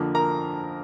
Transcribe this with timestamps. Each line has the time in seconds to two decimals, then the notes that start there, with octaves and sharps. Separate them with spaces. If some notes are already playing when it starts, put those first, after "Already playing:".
Already playing: F2 D3 F3 A#3
0.15 A#4 A#5